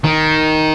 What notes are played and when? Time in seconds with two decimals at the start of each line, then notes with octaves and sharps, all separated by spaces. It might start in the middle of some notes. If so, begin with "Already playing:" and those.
0.04 D#3